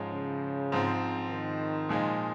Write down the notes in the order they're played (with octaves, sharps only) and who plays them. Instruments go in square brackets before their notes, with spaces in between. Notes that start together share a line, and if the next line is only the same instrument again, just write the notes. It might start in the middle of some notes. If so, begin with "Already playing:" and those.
Already playing: [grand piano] G#2 F3 G#3 C#4
[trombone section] C#3
[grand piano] G#2 F3 C4
[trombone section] D#3
[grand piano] A#2 F3 G#3 D#4